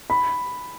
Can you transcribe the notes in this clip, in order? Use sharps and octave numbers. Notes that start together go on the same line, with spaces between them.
B5